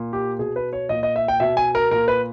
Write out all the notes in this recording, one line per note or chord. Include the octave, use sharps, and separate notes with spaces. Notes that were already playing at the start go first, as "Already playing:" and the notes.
Already playing: A#2
G4
B2 G#4
B4
C#5
A#2 D#5
D#5
E5
G5
B2 E5
G#5
A#4
A#2 A#4
B4